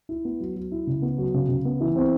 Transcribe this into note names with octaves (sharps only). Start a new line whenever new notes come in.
E4
B3
F#3
F#3
E4
C#3
B3
F#3
C#3
C#3
B3
E3
C4